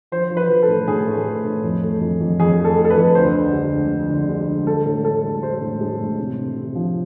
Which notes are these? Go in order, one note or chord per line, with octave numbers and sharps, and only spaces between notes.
F3 C5
F3
B4
F3
A4
A2
A2 G#4
A3
A3
A2
F2
A3
F2
F2
F2 G#4
A3
A4
A3
A4
B4
F2
D2 C5
D3
G#3
D2
D3
D3
G#3
D3
G#3 A4
A2 A4
G#3 A4
G#3
G#3 C5
A2
G#3
A2
C3
C3
C3
F3